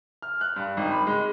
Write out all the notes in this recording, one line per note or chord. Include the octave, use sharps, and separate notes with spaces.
F6
F#6
G2
G#1
B5
G#3